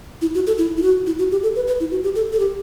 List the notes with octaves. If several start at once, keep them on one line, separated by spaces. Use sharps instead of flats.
E4
F#4
A4
E4
E4
F#4
E4
F#4
G4
A4
B4
B4
E4
F#4
G4
A4
A4
G4